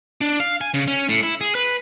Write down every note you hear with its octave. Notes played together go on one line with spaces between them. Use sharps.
D4
F5
G#5
C#3
C#4
A2
E4
G#4
B4